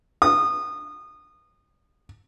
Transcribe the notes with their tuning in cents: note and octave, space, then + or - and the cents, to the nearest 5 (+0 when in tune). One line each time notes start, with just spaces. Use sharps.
D#6 -25